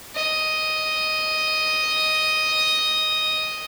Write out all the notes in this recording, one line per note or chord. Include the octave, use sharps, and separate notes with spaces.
D#5